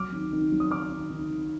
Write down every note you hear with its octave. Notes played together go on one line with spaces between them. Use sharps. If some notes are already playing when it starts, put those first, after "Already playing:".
Already playing: F#3 D6 F6
D#3
D#3
F#3
D#6
D#3 D6 F6
D#3
D#3
D#3